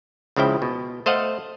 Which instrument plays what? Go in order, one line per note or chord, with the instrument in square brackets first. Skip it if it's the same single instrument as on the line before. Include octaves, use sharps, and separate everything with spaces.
[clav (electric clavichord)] C#2 C#3 F3 E4 G5
B2
A3 C5 D#5 F5 F#5